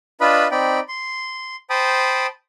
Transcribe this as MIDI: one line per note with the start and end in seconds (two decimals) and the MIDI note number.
0.21 0.47 62
0.21 0.47 65
0.21 0.47 71
0.21 0.47 75
0.21 0.47 83
0.51 0.80 60
0.51 0.80 63
0.51 0.80 74
0.51 0.80 79
0.51 0.80 83
0.88 1.56 84
1.70 2.27 72
1.70 2.27 79
1.70 2.27 81
1.70 2.27 83
1.70 2.27 87